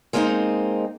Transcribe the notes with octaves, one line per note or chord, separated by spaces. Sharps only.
G#3 A#3 C4 C#4 D#4